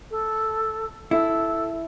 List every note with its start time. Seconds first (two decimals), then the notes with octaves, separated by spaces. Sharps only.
0.11 A4
1.11 E4 A4